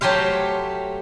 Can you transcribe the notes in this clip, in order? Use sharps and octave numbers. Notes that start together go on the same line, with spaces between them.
F#3 A3 G4 C5 F5